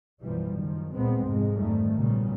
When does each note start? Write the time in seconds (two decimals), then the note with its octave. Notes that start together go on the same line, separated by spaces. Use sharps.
0.21 B1 F#2 E3 F3 G3
0.58 F#1 D#3 F3
0.94 C#2 A#2 G#3 B3 C4
1.25 F2 G#2 C3 G#3
1.55 F2 G#2 D#3 G3 A3
1.95 B1 A#2 C#3 G3